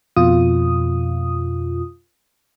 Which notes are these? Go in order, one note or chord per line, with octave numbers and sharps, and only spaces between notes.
F2 B2 F4 D#6